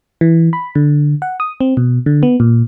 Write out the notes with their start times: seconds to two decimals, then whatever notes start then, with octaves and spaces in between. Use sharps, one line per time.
0.21 E3
0.53 B5
0.75 D3
1.22 F#5
1.40 D#6
1.60 C4
1.77 B2
2.06 D3
2.23 B3
2.40 A#2